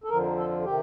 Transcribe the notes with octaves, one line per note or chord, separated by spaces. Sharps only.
A4
F2 D3 F3 A#4
A4
C3 D#3 G4